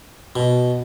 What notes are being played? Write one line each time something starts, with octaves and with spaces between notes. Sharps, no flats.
B2